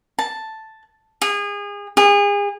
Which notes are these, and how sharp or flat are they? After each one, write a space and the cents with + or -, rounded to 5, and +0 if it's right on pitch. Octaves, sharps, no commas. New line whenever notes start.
A5 +0
G#4 -30
G#4 -35